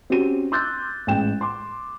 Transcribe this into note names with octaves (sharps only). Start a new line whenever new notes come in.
C4 C#4 F#4 G4 D#7
C6 D6 E6 F#6 G6 A6
A1 G#3 G5 E7
C6 D6